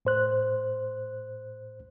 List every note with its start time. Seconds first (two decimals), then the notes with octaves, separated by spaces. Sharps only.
0.05 A2 C5 F#6